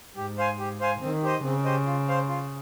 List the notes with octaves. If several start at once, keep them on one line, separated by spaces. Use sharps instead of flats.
G#2 G4
C5 F5 G#5
G4
C5 F5 G#5
D#3 C4
G4 C5 D#5
C#3 C4
G4 C5 D#5
F4
C5 F5
F4